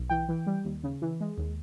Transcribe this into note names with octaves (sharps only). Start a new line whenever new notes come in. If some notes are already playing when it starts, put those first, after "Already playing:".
Already playing: B1
E3 G5
E3
G3
D#2
C#3
E3
G#3
D#2